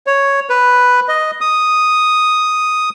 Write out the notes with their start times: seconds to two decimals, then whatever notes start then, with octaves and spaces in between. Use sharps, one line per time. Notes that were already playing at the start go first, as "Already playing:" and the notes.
0.07 C#5
0.50 B4
1.08 D#5
1.41 D#6